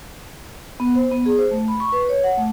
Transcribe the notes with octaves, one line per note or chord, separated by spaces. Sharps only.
B3
C5
B3
G#4
C5
A3
B5
C#6
B4
C#5
F#5
A3